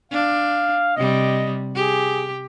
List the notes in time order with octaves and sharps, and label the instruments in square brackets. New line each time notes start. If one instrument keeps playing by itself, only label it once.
[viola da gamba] D4 [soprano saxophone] F5
[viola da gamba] C3 G3 [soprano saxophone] D#5
[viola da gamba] G4 [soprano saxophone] G#4